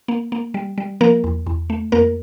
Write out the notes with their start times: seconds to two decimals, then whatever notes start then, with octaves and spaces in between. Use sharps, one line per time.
0.08 A#3
0.32 A#3
0.54 G3
0.78 G3
1.01 F3 A#3 A#4
1.24 E2
1.47 E2
1.70 A3
1.92 F2 A#3 A#4